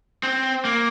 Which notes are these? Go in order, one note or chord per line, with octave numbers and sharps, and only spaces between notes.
C4
A#3